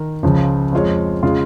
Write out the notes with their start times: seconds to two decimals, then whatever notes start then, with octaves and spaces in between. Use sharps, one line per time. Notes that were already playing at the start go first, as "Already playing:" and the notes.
Already playing: D#3 A#4
0.23 C#2 C#3 F3
0.72 F2 F3 G#3 F4 C#5
1.23 C#3 G#3 F4